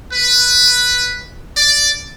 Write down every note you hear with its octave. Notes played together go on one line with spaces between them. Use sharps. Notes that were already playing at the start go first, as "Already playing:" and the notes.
B4
D5